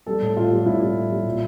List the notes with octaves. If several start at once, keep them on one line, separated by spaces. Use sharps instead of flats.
G3 A4
A2
A2 F4
G3
A2 E4
G3
A2
G3
A#2